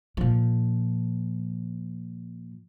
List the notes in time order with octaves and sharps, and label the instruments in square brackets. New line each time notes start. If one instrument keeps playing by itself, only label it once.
[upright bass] A#2 F3